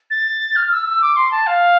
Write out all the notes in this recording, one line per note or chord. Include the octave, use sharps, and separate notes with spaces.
A6
F6
E6
E6
D6
C6
A5
F5